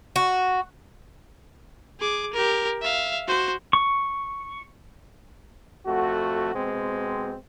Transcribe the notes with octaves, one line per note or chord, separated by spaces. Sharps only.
F#4
G#4 D6
G4 A#4
E5 F5
F#4 C5
C#6
F2 A3 F#4
B2 G#3 C4